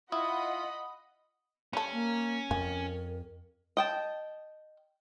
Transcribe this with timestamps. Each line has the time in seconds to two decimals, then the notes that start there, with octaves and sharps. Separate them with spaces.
0.12 E4 F4 D#5 F#5 B5 D#6
1.73 G3 C#4 A4
1.93 A#3
2.51 F2 A#4 G#5
3.77 D#5 G5 A5